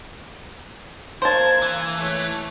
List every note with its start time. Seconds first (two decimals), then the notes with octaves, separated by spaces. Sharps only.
1.22 A#3 C5 A5 G#6
1.62 E3
1.97 A3 C#5